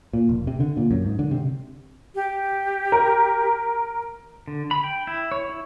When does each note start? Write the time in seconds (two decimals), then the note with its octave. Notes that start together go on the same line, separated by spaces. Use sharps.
0.13 A#2
0.29 F1
0.47 C3
0.60 D3
0.77 A#2
0.91 F#2
1.06 G#2
1.19 D3
1.31 C3
2.15 G4
2.92 A#4
4.48 D3
4.71 B5
4.84 G5
5.07 E4
5.32 C#5
5.49 E4